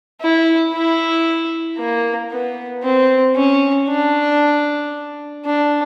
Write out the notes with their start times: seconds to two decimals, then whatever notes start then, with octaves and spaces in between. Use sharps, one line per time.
0.21 E4
0.73 E4
1.78 A#3
2.31 B3
2.83 C4
3.36 C#4
3.88 D4
5.46 D4